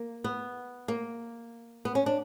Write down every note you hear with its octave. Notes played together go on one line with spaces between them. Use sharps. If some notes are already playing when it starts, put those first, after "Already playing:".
Already playing: A#3
B3
A#3
B3
C#4
D4